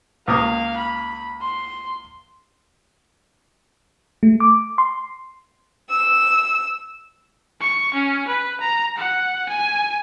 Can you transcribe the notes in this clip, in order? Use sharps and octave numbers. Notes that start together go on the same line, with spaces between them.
C#2 A#3 F5 D#6
B5
C6
A3
D6
C6
E6
C#6
C#4
B4
A#5
F#5
G#5